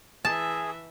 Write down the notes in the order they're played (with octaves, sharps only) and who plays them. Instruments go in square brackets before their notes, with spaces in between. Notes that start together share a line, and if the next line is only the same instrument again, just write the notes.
[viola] E3 E5 [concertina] G#4 [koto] A5